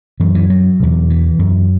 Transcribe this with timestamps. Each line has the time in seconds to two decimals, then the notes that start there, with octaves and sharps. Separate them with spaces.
0.20 F#2 E3
0.35 E3
0.50 F#3
0.80 E2 B2
1.10 E3
1.39 F#2